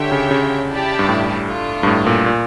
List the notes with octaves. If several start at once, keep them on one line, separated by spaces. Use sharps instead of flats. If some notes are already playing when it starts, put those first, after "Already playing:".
Already playing: D3 G4 C#5 E5 G5
C#3
C#3
E4 G4 D5 A5
G2
A2
A3 D4 F4
G2
A2
A#2
A#2